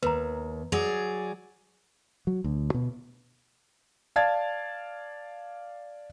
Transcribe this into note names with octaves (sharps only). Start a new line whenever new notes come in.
D#2 B4 A#5
F#3 G#4 D5
F#3
D2
B2
D5 F5 A5 G#6 A6